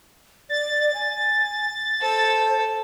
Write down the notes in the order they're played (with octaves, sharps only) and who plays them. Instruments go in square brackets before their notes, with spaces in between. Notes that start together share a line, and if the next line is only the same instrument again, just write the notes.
[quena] D5 [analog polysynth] A6
[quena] G#5
[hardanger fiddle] A4 [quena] C5